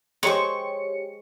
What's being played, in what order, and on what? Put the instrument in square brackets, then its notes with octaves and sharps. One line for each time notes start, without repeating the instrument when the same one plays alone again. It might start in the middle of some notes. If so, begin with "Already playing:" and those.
[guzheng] G#3 C5 [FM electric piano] G4 C#5 C#7 [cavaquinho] C#6